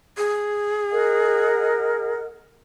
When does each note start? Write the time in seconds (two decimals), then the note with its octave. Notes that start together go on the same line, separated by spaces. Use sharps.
0.17 G#4
0.91 A#4 D#5 F#5